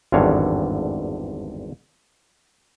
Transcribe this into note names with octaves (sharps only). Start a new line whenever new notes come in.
G#1 E2 G2 D3 C#5 F5